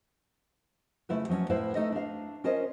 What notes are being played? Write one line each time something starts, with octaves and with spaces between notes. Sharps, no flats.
C#3 A3 E4 F4 B4
F3 F#3 C4 C#4
A2 E4 B4 C5 F5 A5
A3 D#4 A4 D#5
D4 F5
C#4 F4 A#4 C5 C#5 D#5